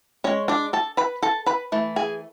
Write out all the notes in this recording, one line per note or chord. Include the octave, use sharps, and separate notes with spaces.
G#3 C#4 C#5
D4 D5
A4 A5
B4 B5
A4 A5
B4 B5
E3 A3
G#4 G#5